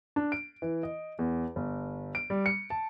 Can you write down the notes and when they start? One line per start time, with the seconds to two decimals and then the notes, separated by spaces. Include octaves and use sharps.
0.16 D4
0.32 D7
0.62 E3
0.83 D#5
1.19 E2
1.56 G1
2.15 D7
2.30 G3
2.46 C#7
2.70 A5